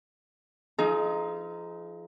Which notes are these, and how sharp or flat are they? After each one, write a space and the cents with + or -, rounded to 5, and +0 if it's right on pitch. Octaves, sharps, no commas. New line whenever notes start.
F3 -25 D#4 +0 G#4 +40